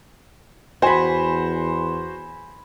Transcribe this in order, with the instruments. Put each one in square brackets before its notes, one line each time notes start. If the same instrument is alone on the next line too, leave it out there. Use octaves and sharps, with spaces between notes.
[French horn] E2 [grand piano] F#4 C5 [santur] G#5 B5